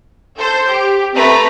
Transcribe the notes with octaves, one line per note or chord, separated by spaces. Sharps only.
A4 C5 G6
G4
A3 C4 B4 A#5 B5